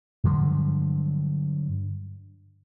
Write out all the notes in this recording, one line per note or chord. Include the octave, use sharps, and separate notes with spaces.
G2 D3 F3 F#3